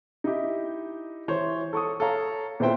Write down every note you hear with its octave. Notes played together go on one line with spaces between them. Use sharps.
D#4 E4 G4
E3 C5 C#5
A4 C#6 D#6
A4 C#5 F5 A#5
A#2 B3 C4 E4 C5 G5